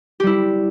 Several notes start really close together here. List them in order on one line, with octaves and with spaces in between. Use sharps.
G4 G3 E4